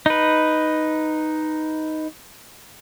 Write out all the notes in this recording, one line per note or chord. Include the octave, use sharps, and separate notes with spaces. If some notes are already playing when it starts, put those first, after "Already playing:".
D#4 B4